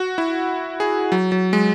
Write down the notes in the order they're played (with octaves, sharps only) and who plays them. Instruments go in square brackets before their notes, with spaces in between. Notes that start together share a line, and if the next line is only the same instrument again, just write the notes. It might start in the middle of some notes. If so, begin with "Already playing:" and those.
Already playing: [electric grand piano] F#4
E4
G#4
F#3
F#3
G#3